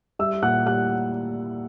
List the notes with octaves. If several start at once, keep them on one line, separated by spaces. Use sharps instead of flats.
G3 E5 E6
A#2 F#5 F#6
G3 F#5 F#6